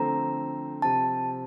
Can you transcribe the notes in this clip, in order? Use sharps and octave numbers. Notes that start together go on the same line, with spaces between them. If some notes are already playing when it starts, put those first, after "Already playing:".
Already playing: D3 F3 A3 C4 A#5
C3 F3 C4 A5